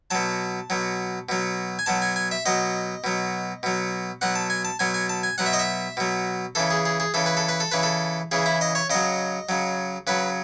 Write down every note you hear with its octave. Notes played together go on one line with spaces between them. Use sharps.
B2 F#3 A5
B2 F#3
B2 F#3
G#5
B2 F#3 A5
G#5
G#5
E5
B2 F#3 D#5
B2 F#3
B2 F#3
B2 F#3 F#5
A5
G#5
A5
B2 F#3 G#5
G#5
A5
G#5
B2 F#3 F#5
E5
D#5
E5
B2 F#3
C#3 E3 A4
G#4
G#4
G#4
C#3 E3 A4
B4
A4
B4
A4
C#3 E3 B4
A4
C#3 E3 G#4
E4
D#5
C#5
C#3 F#3 D#5
C#3 F#3
C#3 F#3 B4